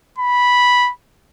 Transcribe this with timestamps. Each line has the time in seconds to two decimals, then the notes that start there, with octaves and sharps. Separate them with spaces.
0.18 B5